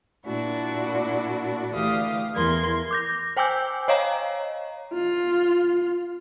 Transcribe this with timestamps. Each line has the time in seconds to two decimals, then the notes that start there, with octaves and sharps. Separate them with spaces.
0.24 A#2 D4 E4 F#4
1.72 D2 D3 E3 G4 F5 D#6
2.34 E2 E3 A#4 C6 G#6
2.91 D6 G6 A#6
3.37 C5 G5 G#5 D6 E6 G6
3.88 C#5 D#5 F5 A#5
4.94 F4